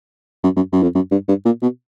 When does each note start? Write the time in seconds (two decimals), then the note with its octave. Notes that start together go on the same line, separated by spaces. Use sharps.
0.44 F#2
0.56 F#2
0.73 F#2
0.83 F2
0.95 F#2
1.11 G2
1.28 G2
1.45 A#2
1.62 B2